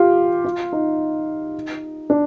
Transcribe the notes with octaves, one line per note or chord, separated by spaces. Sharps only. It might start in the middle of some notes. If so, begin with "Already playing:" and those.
Already playing: F4 G4
F4
D#4
D4